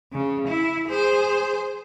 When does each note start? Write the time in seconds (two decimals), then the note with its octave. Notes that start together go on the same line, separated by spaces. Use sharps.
0.13 C#3
0.47 E4
0.89 G#4 C5